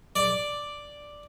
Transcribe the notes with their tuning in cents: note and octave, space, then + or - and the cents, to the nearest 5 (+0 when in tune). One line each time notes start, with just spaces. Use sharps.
D5 +0